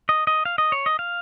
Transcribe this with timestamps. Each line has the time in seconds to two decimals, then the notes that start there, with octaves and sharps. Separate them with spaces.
0.09 D#5
0.27 D#5
0.45 F5
0.58 D#5
0.72 C#5
0.86 D#5
0.99 F5